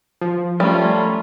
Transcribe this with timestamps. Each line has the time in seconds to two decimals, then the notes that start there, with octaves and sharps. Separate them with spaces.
0.21 F3
0.60 G3 A3 C#4 F4 A#4